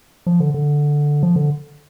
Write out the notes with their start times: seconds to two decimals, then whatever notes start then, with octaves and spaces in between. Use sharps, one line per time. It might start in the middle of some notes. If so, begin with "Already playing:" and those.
0.26 F3
0.40 D3
0.54 D3
1.23 F3
1.36 D3